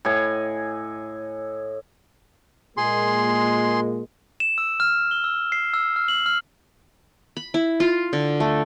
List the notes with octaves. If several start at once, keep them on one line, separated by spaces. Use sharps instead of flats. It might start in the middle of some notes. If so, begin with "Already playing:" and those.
A2 D#5 G#5
A#2 G#3 A#3 G#4 C6
E7
E6
F6
G7
E6
C7
E6
F6
F#7
F6
B5
E4
F4
D3
A3